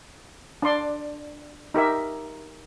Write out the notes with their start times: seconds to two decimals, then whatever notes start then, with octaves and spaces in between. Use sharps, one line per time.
0.62 D4 D5 C6
1.74 D#4 G4 A#4 E5